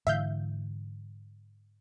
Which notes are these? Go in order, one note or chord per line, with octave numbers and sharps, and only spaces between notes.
G#2 D3 E3 E5 F5 G6